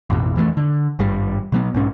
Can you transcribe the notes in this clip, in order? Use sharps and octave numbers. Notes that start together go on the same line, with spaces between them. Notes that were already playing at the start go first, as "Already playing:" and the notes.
A1 F2 B2
F2 E3 F#3 A3
D3
G#1 G2 G3
B2 F#3 B3
B1 G#2 C#4